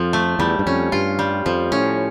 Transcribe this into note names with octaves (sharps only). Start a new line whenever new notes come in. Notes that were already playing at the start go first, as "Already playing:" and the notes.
Already playing: F2 F3
A3
E2 G3
G2
F2 C#4
G2 F4
G3
F2 F3
A2 C#4